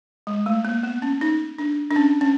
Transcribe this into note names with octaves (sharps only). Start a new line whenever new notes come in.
G#3
A3
A#3
B3
C#4
D#4
D4
D4
C#4
C#4